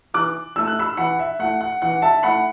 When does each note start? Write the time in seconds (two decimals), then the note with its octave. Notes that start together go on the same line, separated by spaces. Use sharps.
0.14 E3 D6 F#6
0.56 A3 E4 E6
0.67 F#6
0.79 B5 E6
0.97 E3 F#5 B5
1.19 E5
1.39 A3 E4 F#5
1.61 F#5
1.82 E3 F#5
2.02 E5 A5
2.23 A3 E4 F#5 B5